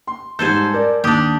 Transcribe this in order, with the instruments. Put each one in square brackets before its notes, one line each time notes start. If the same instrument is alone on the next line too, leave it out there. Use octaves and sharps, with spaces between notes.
[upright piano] C6
[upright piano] G#2 G3 G6 [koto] A4 C5 G#5
[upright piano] A#4 D5
[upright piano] D#2 D#6 [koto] D4 G4